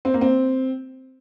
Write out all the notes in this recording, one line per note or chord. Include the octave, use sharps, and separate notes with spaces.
C4
A#3
C4